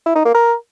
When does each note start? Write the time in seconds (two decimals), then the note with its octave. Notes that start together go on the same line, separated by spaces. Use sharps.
0.06 E4
0.16 D#4
0.25 A#3
0.35 A#4